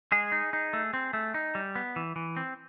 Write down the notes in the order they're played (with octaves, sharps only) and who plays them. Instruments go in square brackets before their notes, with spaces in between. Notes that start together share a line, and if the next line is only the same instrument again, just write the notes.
[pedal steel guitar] G#3 G#4
D#4
D#4
A3
C4
A3
D#4
G3
B3
E3
E3
C4